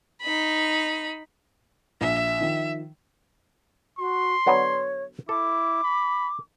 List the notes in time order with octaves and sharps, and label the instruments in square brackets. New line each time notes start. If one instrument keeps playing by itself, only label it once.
[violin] D#4 B5
[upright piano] A#1 [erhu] E5
[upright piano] D#3 F3
[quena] F#4 [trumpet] C6
[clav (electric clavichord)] D3 F#3 B3 [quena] C#5
[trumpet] E4 [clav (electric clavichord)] A4 [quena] D6
[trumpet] B5